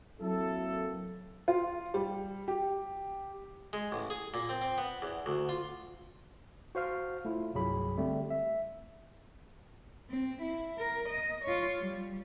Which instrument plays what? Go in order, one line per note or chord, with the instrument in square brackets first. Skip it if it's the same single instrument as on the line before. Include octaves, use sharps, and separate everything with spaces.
[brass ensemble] F#3 A#3 C4 E4 A4
[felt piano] F4
G3
G4
[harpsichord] G#3
A1
G#4
A#2
C4
C4
B3
E2
D2
F4
[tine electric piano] F#4 C5 F5 F6
A3 E4 F4
C2 G2 F#3 G#4 B5
D3 G3 A3 C4
E5
[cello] C4
E4
A#4
D#5
F4 C#5
G3